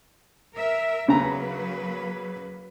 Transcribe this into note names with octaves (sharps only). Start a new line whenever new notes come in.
A#4 E5
C#3 F#3 A#3 B4 A#5